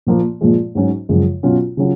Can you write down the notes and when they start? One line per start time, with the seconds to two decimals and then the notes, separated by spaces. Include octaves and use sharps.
0.07 A#2 F3 A#3
0.41 A#2 F3 G#3
0.75 G#2 F#3 C#4
1.09 F#2 C#3 F3 G#3
1.43 B2 F#3 C#4 F4
1.77 C#3 F#3 C#4 F4